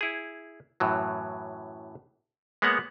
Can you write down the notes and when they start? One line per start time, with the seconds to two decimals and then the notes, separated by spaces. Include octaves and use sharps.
0.01 E4 G#4
0.80 F#2 A2 E3 F#3
2.62 G#3 A#3 B3 C#5 F#5